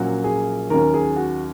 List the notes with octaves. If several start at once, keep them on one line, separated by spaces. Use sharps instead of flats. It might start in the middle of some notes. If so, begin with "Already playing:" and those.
Already playing: A#1 A#2 F#3 C#4 F#4
G#4
D#2 D#3 F#3 C#4 A#4
G#4
F#4